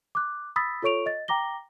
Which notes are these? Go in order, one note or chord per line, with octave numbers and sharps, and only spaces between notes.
D6 F#6
B5 D#6 E6 A6 B6
F4 A4 C#5 C#6 D7 F7
D#5 A6
G5 A#5 D6 A#6 G7